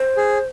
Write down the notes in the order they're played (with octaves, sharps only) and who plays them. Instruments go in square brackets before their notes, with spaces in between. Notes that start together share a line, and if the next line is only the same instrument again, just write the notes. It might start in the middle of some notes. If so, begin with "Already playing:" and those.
Already playing: [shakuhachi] C5
[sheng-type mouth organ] G#4